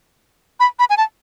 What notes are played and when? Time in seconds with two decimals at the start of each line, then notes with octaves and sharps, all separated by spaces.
0.60 B5
0.79 B5
0.90 G#5
0.97 A5